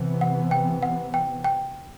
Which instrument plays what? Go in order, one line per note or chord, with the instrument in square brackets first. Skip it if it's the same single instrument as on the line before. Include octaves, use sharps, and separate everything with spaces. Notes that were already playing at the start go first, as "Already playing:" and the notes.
Already playing: [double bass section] C3 E3 B3
[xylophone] F#5
G5
F#5
G5
G5